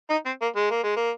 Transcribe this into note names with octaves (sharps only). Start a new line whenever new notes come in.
D#4
C4
A#3
G#3
A#3
G#3
A#3